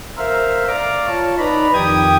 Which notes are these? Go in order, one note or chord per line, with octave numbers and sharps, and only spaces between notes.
A#4 C5 E5 F5
D5 F5 A#5 D6
F4 C#5 A5
D#4 B4 D5 A#5 B5
F2 D#3 G4 G5 D#6 G#6